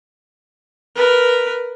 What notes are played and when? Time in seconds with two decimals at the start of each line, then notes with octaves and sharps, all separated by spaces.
0.95 A#4 B4